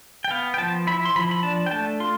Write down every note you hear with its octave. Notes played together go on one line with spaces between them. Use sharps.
G5
B3 F5
G5
F3 A5
E4 B5
C6
F3 B5
B5
D4 A5
G5
A3 A5
F4 C6